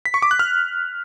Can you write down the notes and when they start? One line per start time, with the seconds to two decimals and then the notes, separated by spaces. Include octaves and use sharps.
0.05 B6
0.14 C#6
0.22 D6
0.31 F#6
0.39 F6